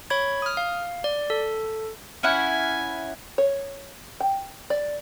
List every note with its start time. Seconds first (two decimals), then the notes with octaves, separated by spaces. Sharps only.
0.10 C#5 B5 G#6
0.42 D#6 F6
0.57 F5
1.04 D5
1.30 A4
2.23 C#4 E4 F#5 G#5
3.38 C#5
4.20 G5
4.70 D5